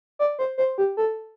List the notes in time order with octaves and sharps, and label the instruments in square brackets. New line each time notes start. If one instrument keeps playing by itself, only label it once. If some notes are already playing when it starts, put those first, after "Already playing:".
[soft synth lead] D5
C5
C5
G4
A4